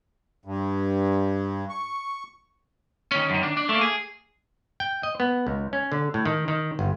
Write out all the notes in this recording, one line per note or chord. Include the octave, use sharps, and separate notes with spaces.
G2
C#6
D#3 C#4
F#2 D#3
D4
D4
A3 A#3
G#4
G5
D#5
B3
C#2
C#4
D3
A2
D#3
D#3
G1